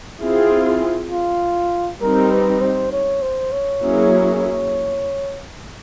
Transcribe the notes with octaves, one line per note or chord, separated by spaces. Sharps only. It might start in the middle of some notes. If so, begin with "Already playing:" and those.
C4 E4 F4 G#4
F4
G3 C4 D#4 A#4
B4
C5
C#5
C5
C#5
F#3 A#3 C#4 E4 G#4